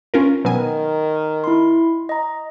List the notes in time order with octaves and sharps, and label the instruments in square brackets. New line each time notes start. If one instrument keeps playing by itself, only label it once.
[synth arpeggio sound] C#4 F4 A#4
[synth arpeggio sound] B2 F#3 G#5 [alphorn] D#3
[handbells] E4 C6
D#5 A#5